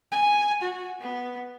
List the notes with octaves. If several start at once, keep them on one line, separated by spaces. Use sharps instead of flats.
G#5
F#4
B3